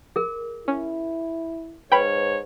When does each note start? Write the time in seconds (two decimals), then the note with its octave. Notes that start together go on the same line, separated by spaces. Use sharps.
0.16 G#4 A#4
0.68 C#4 E4
1.92 G#2 B4 C#5 G5 B5